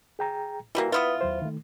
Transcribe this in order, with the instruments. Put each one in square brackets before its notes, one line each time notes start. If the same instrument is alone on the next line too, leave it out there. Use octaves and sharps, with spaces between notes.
[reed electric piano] G#4 G5 A#5
[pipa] E3 G3 A#3 [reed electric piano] E4 F#4
[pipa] B3 E4 F4 [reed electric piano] B4 D#6
[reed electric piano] D#2 F#3 C5
D#3 A3